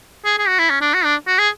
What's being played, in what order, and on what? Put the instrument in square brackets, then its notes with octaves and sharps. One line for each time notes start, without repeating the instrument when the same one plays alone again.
[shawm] G#4
G#4
F#4
E4
C#4
D4
F#4
D4
F#4
G#4